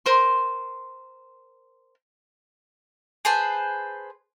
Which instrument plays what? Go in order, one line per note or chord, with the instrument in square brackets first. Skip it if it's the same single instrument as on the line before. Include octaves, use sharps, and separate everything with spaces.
[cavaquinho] A#4 C5 C6
[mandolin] G#4 B4 C5 A5